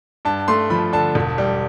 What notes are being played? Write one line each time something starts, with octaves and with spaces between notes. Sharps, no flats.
G2 A5
A3 C6
F3 B5
D3 A5
E1
G3